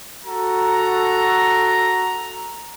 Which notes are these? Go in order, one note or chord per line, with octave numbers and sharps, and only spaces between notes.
F#4 A4 A#5